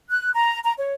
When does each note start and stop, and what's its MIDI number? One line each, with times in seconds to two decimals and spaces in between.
0.11 0.31 90
0.34 0.59 82
0.64 0.73 82
0.78 0.94 73